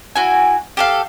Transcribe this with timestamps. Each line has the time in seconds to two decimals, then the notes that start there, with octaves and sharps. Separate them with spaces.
0.16 E4 F#4 G#5
0.77 G4 A4 F5